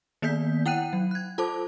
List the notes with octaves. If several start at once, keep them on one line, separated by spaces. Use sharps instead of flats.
D#3 A#3 B3 D5 G6 B6
E4 F#5 G5 F#6 D#7
F#3
F#6 G#6
F4 A4 C5 A5 D6